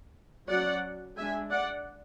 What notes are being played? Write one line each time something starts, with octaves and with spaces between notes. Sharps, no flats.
F#3 C#4 D5 F#5
G#3 D4 E5 G#5
D5 F#5